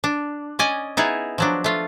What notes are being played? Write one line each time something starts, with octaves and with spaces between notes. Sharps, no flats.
D4
C#4 D5 D#5 G#5
B3 D#4 E4 G#4
F3 F#3 D4
A3 F4